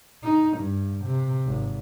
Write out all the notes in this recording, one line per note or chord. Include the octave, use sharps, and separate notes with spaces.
D#4
G2
C3
G#1